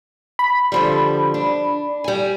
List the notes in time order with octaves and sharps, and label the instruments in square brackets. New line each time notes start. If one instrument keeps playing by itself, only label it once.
[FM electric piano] B5
[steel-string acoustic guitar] D3 F3 G3
D4
G3 G#5